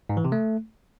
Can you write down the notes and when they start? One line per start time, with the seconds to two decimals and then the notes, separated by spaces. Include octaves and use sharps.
0.09 G#2
0.17 E3
0.25 C3
0.32 A3